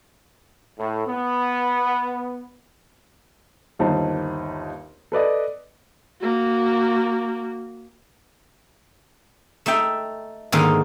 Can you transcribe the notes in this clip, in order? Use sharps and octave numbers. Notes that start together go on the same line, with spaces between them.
A2
B3
G1 D#2 D#4 C5 A5
A4 B4 D5 D#5
A#3 F#4
A3 D#4 E5 G5
G#2 D3 D#3 A3 A#3 D#4